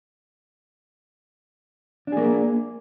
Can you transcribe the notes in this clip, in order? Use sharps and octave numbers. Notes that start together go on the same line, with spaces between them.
A#3 D4 G#4